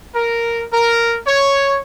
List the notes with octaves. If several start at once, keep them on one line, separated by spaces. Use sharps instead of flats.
A#4
A#4
C#5